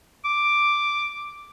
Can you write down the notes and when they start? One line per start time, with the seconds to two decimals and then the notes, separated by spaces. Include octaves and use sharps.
0.25 D6